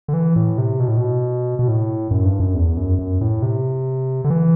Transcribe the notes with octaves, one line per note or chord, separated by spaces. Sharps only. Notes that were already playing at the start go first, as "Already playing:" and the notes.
D3
E3
A2
C3
B2
A2
B2
B2
A2
F#2
G2
F#2
E2
F#2
F#2
A2
C3
D3
E3